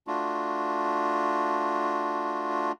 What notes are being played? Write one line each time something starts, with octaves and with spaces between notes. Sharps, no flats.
A3 D4 F4 F#4